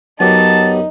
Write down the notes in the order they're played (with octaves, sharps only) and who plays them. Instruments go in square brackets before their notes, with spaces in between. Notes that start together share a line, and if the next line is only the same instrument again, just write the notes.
[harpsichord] F#2 [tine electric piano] F#3 B3 G4 [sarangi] D#4 [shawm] A5